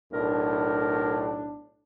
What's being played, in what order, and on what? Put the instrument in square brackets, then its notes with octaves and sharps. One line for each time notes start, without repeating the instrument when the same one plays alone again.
[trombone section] B1 A2 D4 [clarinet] A#4